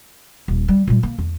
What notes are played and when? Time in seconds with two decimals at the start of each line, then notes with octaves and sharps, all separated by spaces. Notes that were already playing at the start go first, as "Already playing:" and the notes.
0.48 D#1
0.68 G3
0.87 A#2 G3
1.03 A#3
1.18 E2